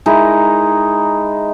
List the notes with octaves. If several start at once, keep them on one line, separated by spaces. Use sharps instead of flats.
G#3 D#4 E4 A#4